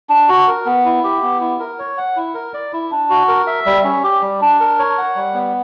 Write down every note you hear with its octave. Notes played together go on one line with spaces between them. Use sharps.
D4
F#4
A#4
B3
E4
G4
B3
E4
A#4
C#5
F#5
E4
A#4
D5
E4
D4
F#4
A#4
E5
G3
C#4
G4
G3
D4
A#4
C#5
F#5
G3
B3